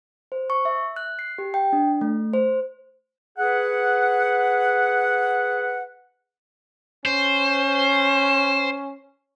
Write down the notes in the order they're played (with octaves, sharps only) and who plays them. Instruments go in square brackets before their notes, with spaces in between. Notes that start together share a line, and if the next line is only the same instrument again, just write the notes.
[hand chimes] C5
C#6
E5
F#6
C7
G4
G5
D4
A3
C5
[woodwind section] G#4 B4 F#5
[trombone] C#4 [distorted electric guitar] C5